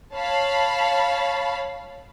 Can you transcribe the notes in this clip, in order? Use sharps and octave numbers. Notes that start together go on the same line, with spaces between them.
C#5 F5 A5 B5